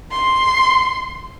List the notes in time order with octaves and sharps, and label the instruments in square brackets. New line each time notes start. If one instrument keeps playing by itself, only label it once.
[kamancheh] C6